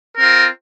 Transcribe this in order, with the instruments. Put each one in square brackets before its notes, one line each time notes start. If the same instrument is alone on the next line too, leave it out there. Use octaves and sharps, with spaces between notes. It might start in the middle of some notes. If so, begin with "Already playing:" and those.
[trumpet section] C4 F4 A#4